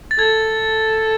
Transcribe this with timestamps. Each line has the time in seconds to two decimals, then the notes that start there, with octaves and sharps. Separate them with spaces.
0.11 A6
0.18 A4 G#6